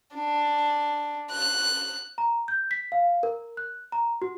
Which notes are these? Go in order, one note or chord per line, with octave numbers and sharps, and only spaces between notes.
D4
F#6
A#5
G6
B6
F5
A#4
F#6
A#5
F#4